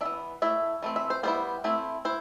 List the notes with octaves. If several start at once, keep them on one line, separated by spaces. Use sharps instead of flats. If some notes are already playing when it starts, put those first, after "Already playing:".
E3 B3 D4 E5
A3 E4 E5
E3 A3 C4
E5
C5
G3 B3 E4 C5
A3 C4 E4
E4 C5